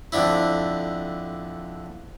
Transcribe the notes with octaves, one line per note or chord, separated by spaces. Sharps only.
F2 D3 D4 E4